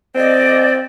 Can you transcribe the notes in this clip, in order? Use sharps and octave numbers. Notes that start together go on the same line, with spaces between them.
C4 D5 D#5